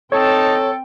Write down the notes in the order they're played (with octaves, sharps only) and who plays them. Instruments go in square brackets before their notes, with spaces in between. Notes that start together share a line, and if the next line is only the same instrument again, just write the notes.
[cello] C4 G5 [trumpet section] D#4 A5 [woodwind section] A4 [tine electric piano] C#5